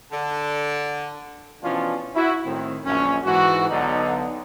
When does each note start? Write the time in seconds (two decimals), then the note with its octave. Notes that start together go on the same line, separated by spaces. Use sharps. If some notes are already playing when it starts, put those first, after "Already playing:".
0.11 D3
1.63 B2 E3 F3 C#4 D4 F4
2.15 E4 F#4
2.45 A2 D#3 C4
2.85 A#1 F#2 C#4
3.24 G#2 E3 F#4
3.69 B1 D3 D#4